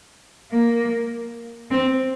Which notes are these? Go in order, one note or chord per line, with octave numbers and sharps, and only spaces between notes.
A#3
C4